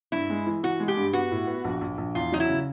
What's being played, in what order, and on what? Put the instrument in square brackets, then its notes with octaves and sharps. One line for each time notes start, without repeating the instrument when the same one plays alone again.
[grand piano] G2 [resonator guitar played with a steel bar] E4
[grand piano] G#3
E3
[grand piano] E3 [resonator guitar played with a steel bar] F#4
[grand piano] G#3
[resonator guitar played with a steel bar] G4
[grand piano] G2
[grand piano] B3 [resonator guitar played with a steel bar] F#4
[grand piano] A2
B3
A#1
A#1
A#1
[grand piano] E2 [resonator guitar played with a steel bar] F4
[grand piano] F#3 [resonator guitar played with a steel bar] D#4
[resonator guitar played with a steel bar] E4
[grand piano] C#3